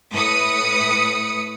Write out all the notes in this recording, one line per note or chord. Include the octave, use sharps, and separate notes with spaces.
A2 B4 D#6 C#7